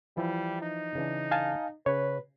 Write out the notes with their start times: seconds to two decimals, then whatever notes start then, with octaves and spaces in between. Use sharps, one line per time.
0.17 E3 F3 G3 E4
0.62 D#4
0.95 C#3 E3 D4
1.31 F5 G#5 A5
1.86 C#3 B4 C#5